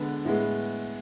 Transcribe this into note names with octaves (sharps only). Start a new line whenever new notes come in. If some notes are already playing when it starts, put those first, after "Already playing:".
Already playing: D3 G#3 B3
A2 G#3 B3